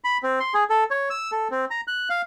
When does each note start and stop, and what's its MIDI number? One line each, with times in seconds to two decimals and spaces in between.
0.04 0.18 83
0.23 0.39 60
0.40 0.54 84
0.54 0.64 68
0.70 0.84 69
0.91 1.09 73
1.10 1.31 88
1.32 1.48 69
1.51 1.65 60
1.71 1.81 82
1.88 2.09 90
2.10 2.22 77